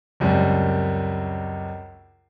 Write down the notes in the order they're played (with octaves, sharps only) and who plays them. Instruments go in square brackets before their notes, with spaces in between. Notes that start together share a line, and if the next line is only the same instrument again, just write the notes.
[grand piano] C#2 F#2 G3 C4